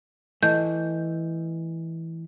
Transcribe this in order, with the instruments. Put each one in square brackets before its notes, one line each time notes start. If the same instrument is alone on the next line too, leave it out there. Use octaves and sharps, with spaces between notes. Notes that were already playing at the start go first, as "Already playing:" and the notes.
[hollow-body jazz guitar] E3 A3 [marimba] D#5 [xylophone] G6